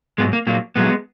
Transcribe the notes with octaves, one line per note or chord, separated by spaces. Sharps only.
G#2 F#3 G#3 B3
A#3
A#2 F#3 A#3
A#2 F#3 G#3 B3